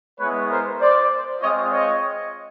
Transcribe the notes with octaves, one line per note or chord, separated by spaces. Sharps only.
G#3 B3 E4 B4 C#5
A#4 C5
C5 D5
G#3 C4 F4 C#5 D#5
C#5 D#5